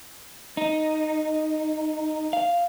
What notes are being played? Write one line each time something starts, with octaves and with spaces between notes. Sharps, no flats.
D#4
F5